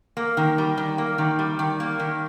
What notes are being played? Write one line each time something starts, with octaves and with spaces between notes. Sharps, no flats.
A#3
D#3
G3
D#3
A#3
D#3
G3
D#3
A#3
D#3